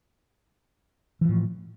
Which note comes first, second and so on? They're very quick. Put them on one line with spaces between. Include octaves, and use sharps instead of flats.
E3 F3 A2